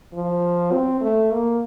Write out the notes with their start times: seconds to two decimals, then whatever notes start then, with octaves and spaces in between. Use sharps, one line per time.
0.14 F3
0.72 C4
1.01 A3
1.31 A#3